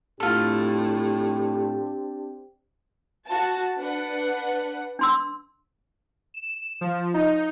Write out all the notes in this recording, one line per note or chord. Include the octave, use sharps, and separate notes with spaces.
A2 C4 D4 F4 G4 A4
F#4 A5
D4 B4 F#5
D4 C6 E6
E7
F3
D#4